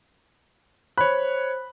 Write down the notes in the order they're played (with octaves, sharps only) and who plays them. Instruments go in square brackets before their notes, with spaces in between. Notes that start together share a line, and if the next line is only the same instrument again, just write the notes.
[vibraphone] C5 [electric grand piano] C#5 F#6 [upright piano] B5